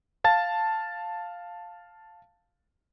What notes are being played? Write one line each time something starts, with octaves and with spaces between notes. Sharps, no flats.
F5 A5 A6